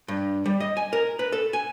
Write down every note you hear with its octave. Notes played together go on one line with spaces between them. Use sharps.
G2
G3
D#5
G#5
A#4
B4
A4
G#5